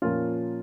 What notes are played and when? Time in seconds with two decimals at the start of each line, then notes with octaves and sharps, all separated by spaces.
0.02 A#2 F3 A#3 C#4 F4